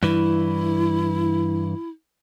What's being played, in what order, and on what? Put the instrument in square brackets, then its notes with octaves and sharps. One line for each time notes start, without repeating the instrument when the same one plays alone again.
[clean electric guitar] G2 E3 [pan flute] E4